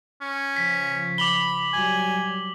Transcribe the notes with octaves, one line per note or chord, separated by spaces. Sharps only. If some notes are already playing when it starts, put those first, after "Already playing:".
C#4
C#3 F3 B6
B5 D6 F#7 G7
F#3 G3 G#5